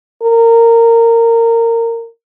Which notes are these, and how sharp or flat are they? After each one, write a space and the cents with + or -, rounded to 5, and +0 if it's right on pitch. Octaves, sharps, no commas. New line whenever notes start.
A#4 -20